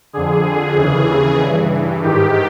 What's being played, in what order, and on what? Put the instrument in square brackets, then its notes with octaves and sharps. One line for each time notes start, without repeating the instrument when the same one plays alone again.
[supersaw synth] F2 D3 G#4
D#2 C#3 E3 G#4
G2 E3
G#2 D#3 G4